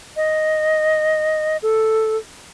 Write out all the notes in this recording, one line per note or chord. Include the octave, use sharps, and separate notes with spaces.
D#5
A4